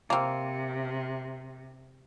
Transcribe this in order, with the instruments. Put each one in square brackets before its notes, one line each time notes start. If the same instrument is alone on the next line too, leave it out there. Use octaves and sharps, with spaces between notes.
[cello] C3 [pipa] A#3 C4